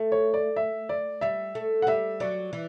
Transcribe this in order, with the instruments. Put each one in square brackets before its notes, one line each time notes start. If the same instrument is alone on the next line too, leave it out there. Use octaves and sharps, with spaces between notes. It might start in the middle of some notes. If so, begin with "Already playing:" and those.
Already playing: [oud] A3
[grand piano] C#5
D5
E5
D5
[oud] G3 [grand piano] E5
[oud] A3
[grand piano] F#5
[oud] G3 [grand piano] E5
[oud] F#3 [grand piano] D5
[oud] E3